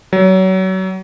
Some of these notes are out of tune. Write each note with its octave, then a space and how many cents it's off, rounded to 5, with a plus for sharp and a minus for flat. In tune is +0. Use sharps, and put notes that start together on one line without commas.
F#3 +30